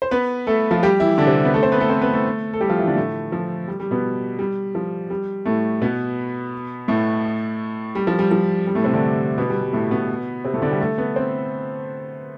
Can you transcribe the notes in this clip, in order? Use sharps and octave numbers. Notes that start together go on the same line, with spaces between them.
C5
B3 B4
A3 A4
F3 F4
G3 G4
E3 E4
D3 D4
C3 C4
B3 B4
A3 A4
C4 C5
B3 B4
A3 A4
C4 C5
B3 B4
A3 A4
A4
G3 G4
F3 F4
E3 E4
D3 D4
A2 A3
F3
G3
G3
B2 B3
G3
F3
G3
A2 A3
B2 B3
A2 A3
G3
F3
G3
F3
G3
A2 A3
C3 C4
D3 D4
B2 B3
G3
G3
A2 A3
B2 B3
C3 C4
A2 A3
D3 D4
G3 G4
A3 A4
B3 B4
C4 C5